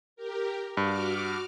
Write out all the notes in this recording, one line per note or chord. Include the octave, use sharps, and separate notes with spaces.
G4 A#4
G2 F#4 D6 F6